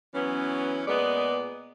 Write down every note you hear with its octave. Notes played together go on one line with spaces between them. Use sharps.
E3 F#3 B3 C#4
A#2 G#3 B3 B4 D5